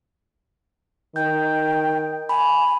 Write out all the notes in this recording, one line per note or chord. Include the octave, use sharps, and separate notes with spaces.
D#3 G5 G6
G#5 B5